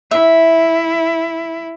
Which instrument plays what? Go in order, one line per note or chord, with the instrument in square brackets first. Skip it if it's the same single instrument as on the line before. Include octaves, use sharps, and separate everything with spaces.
[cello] E4 [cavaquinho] E5